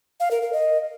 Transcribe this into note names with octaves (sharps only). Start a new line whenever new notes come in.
F5
A#4
A#4
D#5